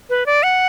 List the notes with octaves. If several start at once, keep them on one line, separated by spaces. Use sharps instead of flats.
B4
D5
F#5